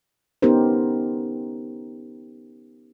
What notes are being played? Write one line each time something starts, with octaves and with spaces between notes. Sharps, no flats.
B3 C#4 D#4 G4 A#4 C5